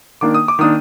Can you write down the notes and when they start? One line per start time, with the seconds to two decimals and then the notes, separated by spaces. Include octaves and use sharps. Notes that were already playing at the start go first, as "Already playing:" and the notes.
0.21 D#3 A#3 D4 D6
0.34 D#6
0.48 D6
0.59 D#3 A#3 D4 D#6